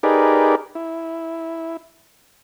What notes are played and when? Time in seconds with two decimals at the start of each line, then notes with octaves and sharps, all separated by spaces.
0.03 D#4 G4 G#4 A#4 B4 D5
0.75 E4